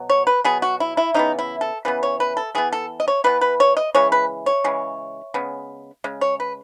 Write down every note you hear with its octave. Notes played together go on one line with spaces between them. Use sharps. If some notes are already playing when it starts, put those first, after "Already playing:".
Already playing: B2 F#3
C#5
B4
B2 F#3 B3 G#4
F#4
E4
E4
C#3 E3 B3 D#4
E4
A4
C#3 E3 B3 B4
C#5
B4
A4
E3 B3 G#4
A4
D#5
C#5
E3 B3 B4
B4
C#5
D#5
C#3 E3 G#3 C#5
B4
C#5
C#3 E3 G#3
C#3 G#3 B3
C#3 G#3
C#5
B4